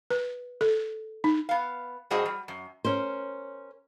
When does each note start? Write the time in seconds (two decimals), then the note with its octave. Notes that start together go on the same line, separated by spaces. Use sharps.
0.10 B4
0.61 A4
1.24 D#4
1.49 B3 F5
2.11 A2 G3 C4 F#4 G#4 D#5
2.26 G3
2.48 F#2
2.85 C#4 A#4 C5